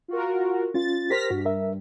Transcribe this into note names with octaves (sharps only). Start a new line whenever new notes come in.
F4 F#4 A#4
C#4 F4 A6
G4 A#4 C5 F6 A#6 B6
G2 F#4
A#4 E5